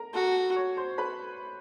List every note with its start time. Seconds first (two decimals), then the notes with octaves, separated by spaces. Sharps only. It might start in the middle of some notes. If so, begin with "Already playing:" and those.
Already playing: A#4 A#5
0.13 F#4 A4 A5
0.56 C#5 C#6
0.77 C5 C6
0.98 B4 B5